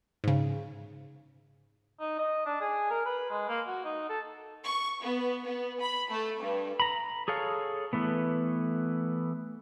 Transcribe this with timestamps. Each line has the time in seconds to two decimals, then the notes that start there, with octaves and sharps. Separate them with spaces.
0.24 G#2 C#3
2.00 D#4
2.19 D#5
2.46 D4
2.61 G#4
2.90 A#4
3.06 B4
3.30 G#3
3.49 A#3
3.67 F#4
3.85 D#4
4.09 A4
4.63 C#6
5.01 B3
5.47 B3
5.80 B5
6.10 A3
6.40 G2
6.80 A#5 B5
7.28 G#4 A4 C#5 F5
7.93 E3 A3 B3